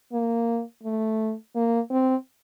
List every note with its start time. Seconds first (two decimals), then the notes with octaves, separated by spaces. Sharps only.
0.12 A#3
0.83 A3
1.55 A#3
1.91 C4